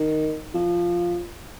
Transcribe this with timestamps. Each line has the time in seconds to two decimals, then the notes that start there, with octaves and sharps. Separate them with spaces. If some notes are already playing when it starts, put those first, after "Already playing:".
Already playing: D#3
0.54 F3